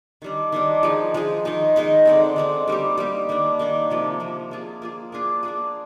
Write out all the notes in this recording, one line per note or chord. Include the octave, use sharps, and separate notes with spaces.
D#3 G3 D4
D#3 G3 D4
F3 G#3 D#4 G#4
F3 G#3 D#4 G#4
D#3 G#3 D#4
D#3 G#3 D#4
D3 G#3 C4
D3 G#3 C4
G3 A#3 D#4 G4
G3 A#3 D#4 G4
D#3 A#3 D4
D#3 A#3 D4
C3 F3 A#3
C3 F3 A#3
A#3 F4 G#4
A#3 F4 G#4
A#3 D4 F4 G#4
A#3 D4 F4 G#4